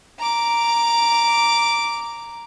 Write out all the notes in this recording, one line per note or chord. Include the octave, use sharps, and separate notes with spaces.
A#5 D6